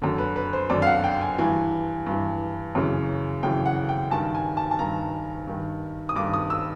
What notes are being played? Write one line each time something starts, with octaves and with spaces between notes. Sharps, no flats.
F#2 D3
B4
B4
C5
F#2 D3 D5
F5
F#5
G5
G#5
G2 E3 G#5
G2 E3
F#2 C#3 E3
F#2 C#3 E3 G5
F#5
G5
G2 D#3 A5
G#5
A5
A5
G2 D#3 A#5
G2 D#3
D#6
G2 D#3 D6
D#6
E6